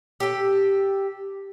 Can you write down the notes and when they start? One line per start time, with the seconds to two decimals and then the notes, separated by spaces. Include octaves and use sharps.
0.20 G4 A4